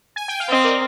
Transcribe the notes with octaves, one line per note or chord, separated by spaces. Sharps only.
G#5
G5
F5
C4 D#5
A#4 D5